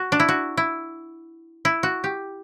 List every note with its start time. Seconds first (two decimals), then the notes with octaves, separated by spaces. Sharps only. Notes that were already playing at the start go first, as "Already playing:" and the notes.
Already playing: F#4
0.12 D4
0.20 E4
0.29 F#4
0.57 E4
1.65 E4
1.83 F#4
2.04 G4